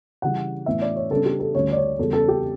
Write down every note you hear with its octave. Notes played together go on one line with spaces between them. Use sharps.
C#3 E3 G3 F#5
A2 E3 B3 E5
D5
C#5
C#3 G3 B3 D4 A4
G4
A4
D2 D3 G3 C#4 C#5
D5
C#5
E2 C#3 G3 A4
A4
G4